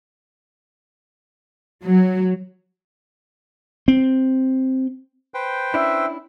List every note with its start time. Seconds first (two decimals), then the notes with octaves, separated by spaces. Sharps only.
1.87 F#3
3.88 C4
5.34 B4 C5 G5
5.74 C#4 D4 E4 E5